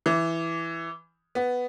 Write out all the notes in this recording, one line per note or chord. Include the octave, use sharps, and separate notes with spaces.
E3
B3